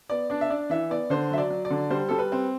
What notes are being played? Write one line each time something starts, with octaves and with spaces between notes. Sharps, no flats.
B3 D5
D4 D5
E5
D4 D5
E3 E5
B3 D5
D3 C5
F#3 E5
D5
F#3
D5
D3
G3 C5
G3 A4
B4
C4